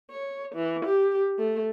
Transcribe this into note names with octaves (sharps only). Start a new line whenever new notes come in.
C#5
E3
G4
A3